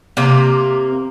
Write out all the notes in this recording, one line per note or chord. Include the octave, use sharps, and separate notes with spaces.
C3 A#3